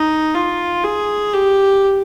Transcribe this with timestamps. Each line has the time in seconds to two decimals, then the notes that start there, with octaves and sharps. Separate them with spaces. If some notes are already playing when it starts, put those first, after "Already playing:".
Already playing: D#4
0.34 F4
0.84 G#4
1.33 G4